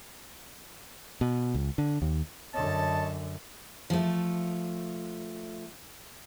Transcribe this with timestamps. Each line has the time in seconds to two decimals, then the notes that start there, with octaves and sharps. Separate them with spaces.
1.21 B2
1.55 C#2
1.78 D3
2.02 D#2
2.54 F#2 D3 C#5 D#5 A5
3.90 F3 A3